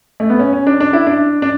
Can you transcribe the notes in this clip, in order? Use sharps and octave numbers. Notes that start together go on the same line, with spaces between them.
A3
B3
C#4
C#4
D4
D4
E4
D4
D4